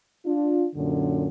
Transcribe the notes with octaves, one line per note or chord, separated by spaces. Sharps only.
D4 F4
F#2 A#2 D3 C#4